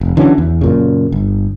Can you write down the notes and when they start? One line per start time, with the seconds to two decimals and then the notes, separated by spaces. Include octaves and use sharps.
0.01 F1
0.17 D3 E3 F#3 C#4
0.38 E2
0.61 F#2 A#2 C#3
1.12 G1